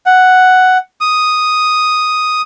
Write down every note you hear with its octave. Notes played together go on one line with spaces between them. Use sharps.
F#5
D#6